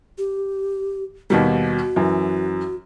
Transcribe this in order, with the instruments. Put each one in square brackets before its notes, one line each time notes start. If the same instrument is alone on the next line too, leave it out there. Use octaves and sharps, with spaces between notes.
[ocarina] G4
[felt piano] D#2 B2 G3 [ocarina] F#4
[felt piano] F#2 E3